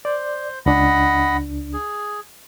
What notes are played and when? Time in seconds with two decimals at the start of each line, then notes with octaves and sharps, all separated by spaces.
0.05 C5 D5
0.66 C#2 D4 D#5 F#5 B5
1.73 G#4